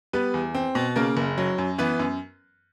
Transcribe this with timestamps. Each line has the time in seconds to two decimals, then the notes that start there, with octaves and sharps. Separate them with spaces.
0.13 G3 B3 B4
0.34 E2
0.55 C4
0.75 B2
0.96 C#3 A#3 A#4
1.17 F#1
1.38 F#3
1.58 F#2
1.78 E3 B3 B4
1.99 F#2